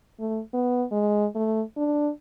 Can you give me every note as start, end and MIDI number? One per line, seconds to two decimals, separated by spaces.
0.19 0.41 57
0.53 0.84 59
0.92 1.26 56
1.35 1.62 57
1.77 2.10 62